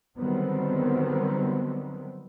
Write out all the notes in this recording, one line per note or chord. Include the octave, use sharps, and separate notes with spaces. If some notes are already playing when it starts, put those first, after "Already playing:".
D3 D#3 F#3 G3 B3 C4